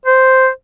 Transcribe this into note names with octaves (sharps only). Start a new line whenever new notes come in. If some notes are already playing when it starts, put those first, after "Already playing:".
C5